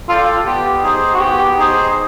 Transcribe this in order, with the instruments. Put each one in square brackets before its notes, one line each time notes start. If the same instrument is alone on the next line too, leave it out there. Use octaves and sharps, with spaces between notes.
[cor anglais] F4 [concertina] A4 D5 G5
[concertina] B3 [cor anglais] G4
[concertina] D#4 G#4 C5
[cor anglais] F#4
[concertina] B3 [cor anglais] G4
[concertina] D#4 G#4 C5